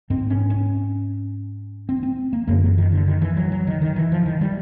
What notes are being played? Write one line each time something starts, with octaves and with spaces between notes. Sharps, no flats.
G#2 C4
C#4
C#4
C4
C4
A#3
F#2 D3 A#3
E3
D#3
D3
D#3
E3
F#3
F#3
D#3
D#3
E3
F3
D#3
G3